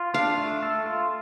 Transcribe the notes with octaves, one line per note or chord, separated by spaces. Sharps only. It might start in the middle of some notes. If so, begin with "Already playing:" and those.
Already playing: F4
D4 F5
A3
A4
F4